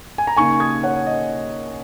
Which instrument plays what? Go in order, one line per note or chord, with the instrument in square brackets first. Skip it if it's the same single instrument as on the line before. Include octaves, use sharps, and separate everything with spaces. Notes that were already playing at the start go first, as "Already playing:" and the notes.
[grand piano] G#5
A#5
C#3 A#3 D#4 G#5 C#6
D#6 G#6
C#5 F#5
D#5